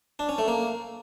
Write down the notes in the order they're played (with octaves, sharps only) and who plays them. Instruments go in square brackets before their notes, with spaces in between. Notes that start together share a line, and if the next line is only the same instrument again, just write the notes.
[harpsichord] D4
C#4
A3
A#3